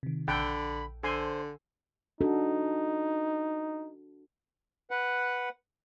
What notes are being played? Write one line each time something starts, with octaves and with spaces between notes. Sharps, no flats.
C3 D#3
A#1 D3 A4 F#5 G5 B5
D3 A4 C5 G#5 C6
D4 D#4 F#4 A4
B4 F#5